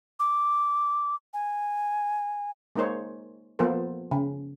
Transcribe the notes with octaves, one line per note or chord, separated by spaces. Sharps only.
D6
G#5
G#3 A#3 D#4 A#4 C5 C#5
F3 A#3 B3 A4 A#4 C5
C#3